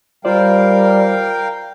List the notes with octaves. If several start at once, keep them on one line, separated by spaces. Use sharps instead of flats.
G3 F4 A#4 C5 D5 F5 G5